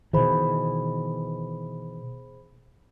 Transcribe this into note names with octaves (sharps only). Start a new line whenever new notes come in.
B2 D#3 E3 G#4 C5 B5